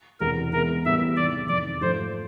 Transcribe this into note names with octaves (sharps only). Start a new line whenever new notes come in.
E1 E2 C3 A#4
E3 G#3 B3 A#4
A2 E3 G3 B3 E5
E2 C3 D#3 D5
F2 C3 D#3 D5
G#2 F3 A3 C5